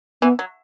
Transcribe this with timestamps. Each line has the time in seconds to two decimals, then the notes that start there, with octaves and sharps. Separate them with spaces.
0.22 E3 B3
0.39 F#3